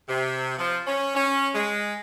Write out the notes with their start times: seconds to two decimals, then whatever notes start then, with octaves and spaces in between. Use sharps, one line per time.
0.08 C3
0.58 F3
0.86 C#4
1.15 C#4
1.54 G#3